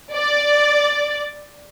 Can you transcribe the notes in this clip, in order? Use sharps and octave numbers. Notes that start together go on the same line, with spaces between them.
D5